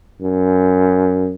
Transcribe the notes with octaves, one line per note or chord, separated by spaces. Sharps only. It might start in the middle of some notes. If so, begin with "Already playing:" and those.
F#2